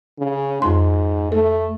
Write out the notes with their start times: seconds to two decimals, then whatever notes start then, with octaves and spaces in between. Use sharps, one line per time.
0.19 C#3
0.62 F2 G#2 C6
1.32 A3 A4